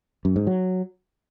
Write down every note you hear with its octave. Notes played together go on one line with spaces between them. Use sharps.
F#2
G#2
F#3